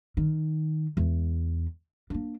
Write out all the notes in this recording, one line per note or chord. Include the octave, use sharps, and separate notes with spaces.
D#3
E2 G#3
A#3 D4